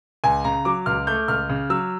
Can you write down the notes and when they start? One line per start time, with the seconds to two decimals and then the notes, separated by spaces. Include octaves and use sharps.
0.24 C#2 G#5
0.44 C#3 A#5
0.65 F#3 D6
0.86 C#2 F6
1.07 A3 G6
1.28 C#2 F6
1.49 C#3
1.70 F#3 E6